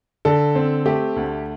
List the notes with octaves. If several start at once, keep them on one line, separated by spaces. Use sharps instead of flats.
D3 A4
C4
A3 G4
D2